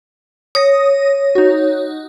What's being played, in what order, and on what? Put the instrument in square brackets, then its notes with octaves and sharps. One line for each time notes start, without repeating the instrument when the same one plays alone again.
[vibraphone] C#5 [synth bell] D#6 A#6
[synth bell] D#4 F#4